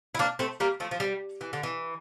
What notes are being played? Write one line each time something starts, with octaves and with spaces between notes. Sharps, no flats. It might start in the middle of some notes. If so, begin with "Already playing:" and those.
E4
A#3 D4
A3 C4
G3 A#3
F3 A3
F3
G3
E3
D3
E3